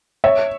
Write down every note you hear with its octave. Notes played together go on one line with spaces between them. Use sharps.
C#5 E5